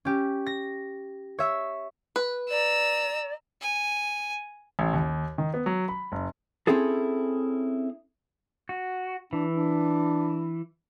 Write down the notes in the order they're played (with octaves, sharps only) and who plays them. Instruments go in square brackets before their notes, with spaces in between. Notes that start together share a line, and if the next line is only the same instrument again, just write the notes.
[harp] C#4 G4
A#6
C#5 E5 E6
[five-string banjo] B4
[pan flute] D5 [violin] A#5 E6
[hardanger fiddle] G#5
[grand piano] A1
D#2
D#3
B3
F#3
B5
F#1
[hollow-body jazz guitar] C4 C#4 E4 G#4 A4
[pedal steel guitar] F#4
[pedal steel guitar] E3 [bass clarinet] D4
[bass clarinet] D4